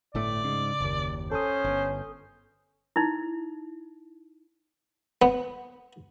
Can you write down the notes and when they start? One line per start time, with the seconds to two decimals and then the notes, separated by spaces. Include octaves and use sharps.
0.15 G1 A2 A3 D5
0.44 G#2 C#3
0.80 F#1 D#2
1.31 C#4 A4 C5 D#6
1.64 G1
2.96 D#4 E4
5.22 B3